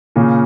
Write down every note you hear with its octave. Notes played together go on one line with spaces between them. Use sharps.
A#2 C#3